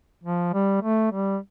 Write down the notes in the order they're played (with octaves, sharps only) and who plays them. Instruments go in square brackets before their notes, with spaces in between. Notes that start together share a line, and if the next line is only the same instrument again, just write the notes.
[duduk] F3
G3
A3
G3